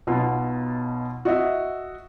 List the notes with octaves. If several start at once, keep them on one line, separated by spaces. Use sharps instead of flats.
B1 B2 F4
F#4 D#5 E5